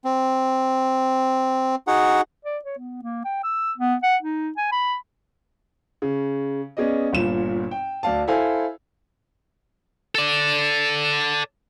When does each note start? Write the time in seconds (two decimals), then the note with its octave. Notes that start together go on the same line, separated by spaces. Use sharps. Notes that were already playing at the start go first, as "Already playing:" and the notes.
0.04 C4
1.87 D#4 F#4 G#4 F#5
2.45 D5
2.65 C#5
2.78 B3
3.03 A#3
3.25 G5
3.43 E6
3.78 B3
4.03 F#5
4.22 D#4
4.57 G#5
4.72 B5
6.02 C#3
6.77 B3 C#4 G#4 D5 D#5
7.13 G1 A#2 E7
7.71 G5
8.03 D2 D5 F5 A5
8.27 E4 A4 C5 F5 G#5
10.15 A4 D5